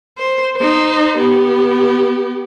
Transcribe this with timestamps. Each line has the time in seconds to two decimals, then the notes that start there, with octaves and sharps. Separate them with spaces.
0.18 C5
0.56 D#4 C5
1.17 B3 G4